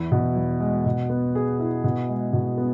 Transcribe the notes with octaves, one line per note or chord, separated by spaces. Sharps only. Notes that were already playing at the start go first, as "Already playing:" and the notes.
Already playing: E2 E4
B2
E2
G#3
B2
B3
G#4
E4
B2
G#3
B2
B3